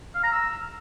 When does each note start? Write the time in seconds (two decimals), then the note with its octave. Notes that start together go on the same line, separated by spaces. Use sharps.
0.15 F5
0.23 A#5
0.32 E6